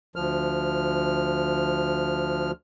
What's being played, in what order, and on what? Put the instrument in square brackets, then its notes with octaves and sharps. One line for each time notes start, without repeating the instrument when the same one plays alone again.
[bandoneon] D2 F3 F6